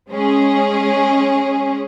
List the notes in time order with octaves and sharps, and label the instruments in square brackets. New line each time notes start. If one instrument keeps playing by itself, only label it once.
[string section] G#3 C#4 G#4